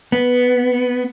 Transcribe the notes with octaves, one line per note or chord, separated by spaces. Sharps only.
B3